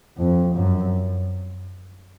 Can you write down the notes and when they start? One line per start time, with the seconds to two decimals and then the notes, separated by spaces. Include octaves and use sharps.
0.18 F2
0.56 F#2